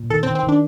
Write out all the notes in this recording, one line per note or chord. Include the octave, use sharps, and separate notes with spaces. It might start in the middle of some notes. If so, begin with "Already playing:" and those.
Already playing: A#2
D#3 A4
C4
D#3
C4
D#3
D4